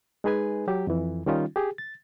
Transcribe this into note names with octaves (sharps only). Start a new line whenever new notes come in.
G#3 D#4 G#4 B4 G#5
F#3 G4
F2 E3
D#3 G3 C#4 D#4 F4
G4 G#4
A6